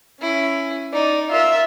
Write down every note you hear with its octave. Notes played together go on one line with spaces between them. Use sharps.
C#4 E4
D#4 D5
F4 A#4 E5